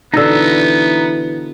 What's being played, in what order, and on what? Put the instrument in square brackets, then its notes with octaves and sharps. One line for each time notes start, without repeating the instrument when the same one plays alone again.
[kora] B2 D3 [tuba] E3 [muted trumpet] B3 [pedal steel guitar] D#4 E6